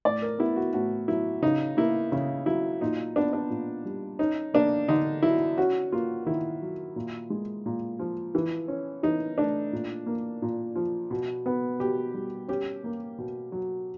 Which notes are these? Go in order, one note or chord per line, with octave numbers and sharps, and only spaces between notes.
A2 D5
A#4
B3 E4
F#4
A2 F#4
F#3 E4
C#3 D#4
A#3 E4
C#3
F#3 E4
A#2 D#4
B3 D4
D4
A#2
G3
C#4 D#4
A#3 D4
D3 D#4
F#3 E4
C#4 F#4
A#3 F4
D#3 E4
F#3
A#2
G#3
A#2
F3
E3
C#4
E3 D#4
A3 D4
A#2
A#3
A#2
F3
B2
B3
B2 G4
G3
C#4 G4
A#3
B2
F#3